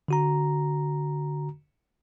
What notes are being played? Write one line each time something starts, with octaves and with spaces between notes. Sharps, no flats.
D3 F#4 A#5